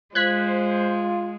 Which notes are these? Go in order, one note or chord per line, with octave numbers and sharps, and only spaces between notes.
G#3 F4 C5 F#6 G#6 B6